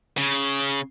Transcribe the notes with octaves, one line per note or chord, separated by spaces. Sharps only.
C#3